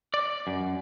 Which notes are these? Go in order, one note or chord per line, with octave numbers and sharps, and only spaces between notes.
D5
F#2